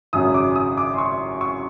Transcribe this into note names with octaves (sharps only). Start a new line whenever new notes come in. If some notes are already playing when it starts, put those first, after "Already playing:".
G#1 F#2 C#3 F#3 D#6
D6
D#6
D6
C6
C#6
C#6